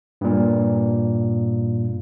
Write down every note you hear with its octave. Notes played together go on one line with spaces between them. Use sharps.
G2 A#2